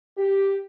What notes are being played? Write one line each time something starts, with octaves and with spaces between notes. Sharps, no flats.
G4